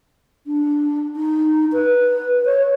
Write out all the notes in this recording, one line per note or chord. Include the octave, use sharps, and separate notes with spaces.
D4
D#4
B4
C#5